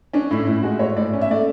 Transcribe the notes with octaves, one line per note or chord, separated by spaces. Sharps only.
C#4 D4
A2 E4
A2 E4
G#3 F#4
A2 C#5
A2 D5
C#4
E5
A3 D5